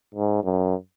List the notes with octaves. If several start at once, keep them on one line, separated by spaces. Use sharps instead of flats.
G#2
F#2